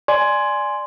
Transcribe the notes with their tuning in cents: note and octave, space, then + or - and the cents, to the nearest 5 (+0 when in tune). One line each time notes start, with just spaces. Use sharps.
D5 +0 G#5 +0 C6 +0